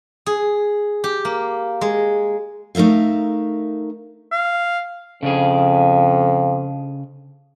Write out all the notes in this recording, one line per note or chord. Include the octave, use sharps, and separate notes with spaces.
G#4
G4
A#3
G#3
A3 D#4 A#4 E5 F5
F5
F2 C#3 D4 G#4